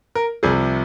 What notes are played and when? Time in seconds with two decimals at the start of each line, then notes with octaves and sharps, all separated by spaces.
0.15 A#4
0.43 C2 C3 F3 G#4